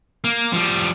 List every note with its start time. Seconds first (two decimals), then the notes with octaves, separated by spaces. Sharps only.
0.24 A#3
0.53 F3 G3